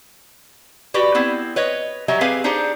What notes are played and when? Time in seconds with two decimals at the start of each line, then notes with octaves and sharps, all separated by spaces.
0.94 F#4 G4 B4 D5
1.15 B3 C4 E4
1.56 B4 C#5 D#5
2.08 F#3 G3 D#5 E5 G#5 A#5
2.21 C4 G4 G#4 B4 F5 G#5
2.44 D4 D#4 G4 G#4 C5